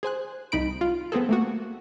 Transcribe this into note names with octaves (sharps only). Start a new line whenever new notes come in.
G#4 C5 G#5 F#6
C2 D#4 B5 D7
F4
B3 C4 G#4 A4
A3 A#3 F#4